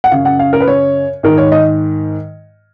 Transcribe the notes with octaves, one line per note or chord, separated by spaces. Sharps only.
F#5
F#2 C#3 F5
F#5
F5
A#4
B4
C#5
G#2 D#3 A#4
C#5
D#5